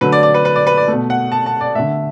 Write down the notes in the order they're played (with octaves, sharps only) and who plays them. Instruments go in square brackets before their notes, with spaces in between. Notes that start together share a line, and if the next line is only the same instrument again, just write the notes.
[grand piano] D3 F#3 A3 B4
D5
D5
B4
B4
D5
B4
D5
B2 A3
F#5
A5
A5
D5
D3 A3 E5